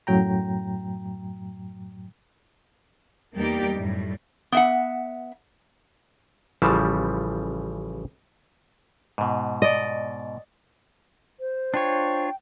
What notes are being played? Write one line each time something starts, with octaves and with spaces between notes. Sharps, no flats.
F#2 A2 F#3 G5 A#5
E2 G3 A#3 D#4 G4 D5
F#2 A2 G3
B3 E5 F#5
A1 C#3 E3 F3 G3 A5
G#2 B2
D5 D#5
C5
D4 F4 C#5 G5